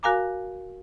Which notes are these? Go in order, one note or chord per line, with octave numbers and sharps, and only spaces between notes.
F#4 A#4 F5 G#5 A#5 D6